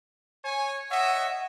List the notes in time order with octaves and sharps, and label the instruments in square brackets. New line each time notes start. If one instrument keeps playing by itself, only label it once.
[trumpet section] C#5 G#5
[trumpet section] C#5 D#5 E5 [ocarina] F#5